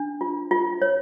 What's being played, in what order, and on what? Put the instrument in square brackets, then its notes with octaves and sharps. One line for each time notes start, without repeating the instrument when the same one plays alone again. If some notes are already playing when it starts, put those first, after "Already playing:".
Already playing: [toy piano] D4
F4
F4
C#5